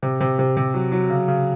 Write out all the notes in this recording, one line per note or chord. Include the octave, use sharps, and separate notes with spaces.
C3
C3
C3
C3
F#3
F#3
C#3
C#3